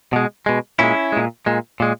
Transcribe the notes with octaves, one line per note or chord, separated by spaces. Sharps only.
B2 G#3
B2 G#3
A#2 G#3 C#4 E4
A#2 G#3
A#2 G#3
A#2 G#3